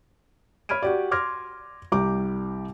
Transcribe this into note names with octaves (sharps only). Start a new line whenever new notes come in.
C#5 B5 F6 G#6 D7 D#7
F#4 G4 D5
C6 D6 F6 G#6 A#6
C2 G3 G4 A#5 D6